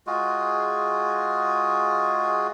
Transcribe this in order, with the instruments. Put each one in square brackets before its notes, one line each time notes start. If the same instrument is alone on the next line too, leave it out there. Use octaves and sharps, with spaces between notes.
[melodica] G#3 F4 F#4 G#4